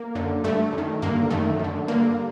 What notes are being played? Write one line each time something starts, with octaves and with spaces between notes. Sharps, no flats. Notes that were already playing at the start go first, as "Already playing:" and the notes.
Already playing: A#3
F#2 D3
G2 D3 A3
F#2
D#3
G2 D3 A#3
F#2 D#3 A3
F#2 D3
G2 D3 A#3